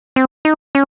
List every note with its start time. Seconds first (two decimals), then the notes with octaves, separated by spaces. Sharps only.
0.16 C4
0.45 D#4
0.75 C#4